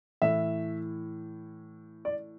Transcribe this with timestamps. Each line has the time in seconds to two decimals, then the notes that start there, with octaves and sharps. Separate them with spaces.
0.22 A2 E3 E5
2.05 D5